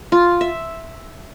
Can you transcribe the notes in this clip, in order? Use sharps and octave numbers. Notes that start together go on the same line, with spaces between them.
F4
E5